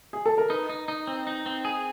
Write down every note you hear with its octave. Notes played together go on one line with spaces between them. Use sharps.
G#4
A4
A#4
D#4 B4
D#4
D#4
C4
D#4
C4
G#4